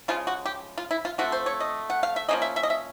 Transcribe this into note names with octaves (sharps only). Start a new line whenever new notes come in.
C#3 F3 G#3 F4
F#4
G4
F4
E4
F4
D3 F3 A3 C4 F#4
C5
C#5
D#5
F#5
F5
E5
F3 A#3 C#4 D#5
E5
E5
D#5
E5